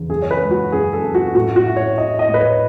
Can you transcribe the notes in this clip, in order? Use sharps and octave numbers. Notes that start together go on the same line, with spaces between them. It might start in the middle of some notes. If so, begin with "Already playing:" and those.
Already playing: E2 C#3
F#2 G#4
C#5
B4
G#3
F#4
F#2 G#4
A4
F#2
F#4
A2 F#4
F#4
E4
C#5
E4 D#5
D#5
A2
B4
C#5